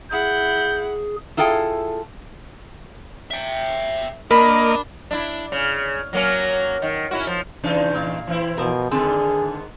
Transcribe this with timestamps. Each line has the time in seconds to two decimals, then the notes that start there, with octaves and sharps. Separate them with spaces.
0.12 E4 G#4 F#5 G6
1.37 E4 F4 G#4 A4 G5
3.31 E5 G5
4.31 A#3 D4 A#4 D#5 B5
5.11 D4 E4
5.52 C#3
6.13 F#3 A#3 C#4
6.82 D#3
7.11 C#4 E4 F#4
7.27 F3
7.64 C3 E3 D4 D#4
7.95 A#2 F5
8.27 E3 C4 E4
8.58 B2 F3 A#4
8.91 G#2 D3 D#3 C4 D4 G#4